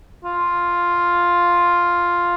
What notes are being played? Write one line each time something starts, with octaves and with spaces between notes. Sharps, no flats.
F4